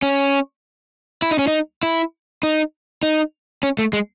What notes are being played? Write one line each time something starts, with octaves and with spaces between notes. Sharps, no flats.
C#4
E4
D#4
C#4
D#4
E4
D#4
D#4
C#4
A3
G#3